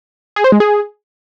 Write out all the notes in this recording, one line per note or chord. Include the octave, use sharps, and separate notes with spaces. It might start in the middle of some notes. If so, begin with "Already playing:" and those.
G#4
C5
G#3
G#4